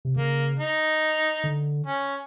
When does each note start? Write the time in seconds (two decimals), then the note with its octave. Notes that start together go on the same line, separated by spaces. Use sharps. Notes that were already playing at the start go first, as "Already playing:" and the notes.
0.05 C3
0.16 C#3 A#3
0.59 D#4
1.44 D3
1.86 C#4